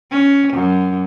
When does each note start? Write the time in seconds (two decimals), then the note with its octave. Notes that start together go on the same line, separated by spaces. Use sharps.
0.11 C#4
0.53 F#2